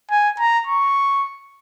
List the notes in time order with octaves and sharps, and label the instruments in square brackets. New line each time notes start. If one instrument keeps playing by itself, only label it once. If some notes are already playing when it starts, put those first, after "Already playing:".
[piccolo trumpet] G#5
A#5
C#6